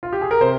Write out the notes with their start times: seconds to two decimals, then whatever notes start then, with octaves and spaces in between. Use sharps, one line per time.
0.03 F4
0.13 G4
0.21 G#4
0.31 A#4
0.41 C3 C5